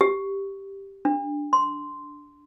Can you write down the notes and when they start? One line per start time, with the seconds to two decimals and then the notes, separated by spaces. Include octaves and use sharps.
0.01 G4
1.05 D4
1.53 C6